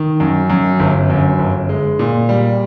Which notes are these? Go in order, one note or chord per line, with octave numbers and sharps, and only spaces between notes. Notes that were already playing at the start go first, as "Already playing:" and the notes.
Already playing: D#3
F#2
F#2
G1
F#2
G1
G#3
A#2
G3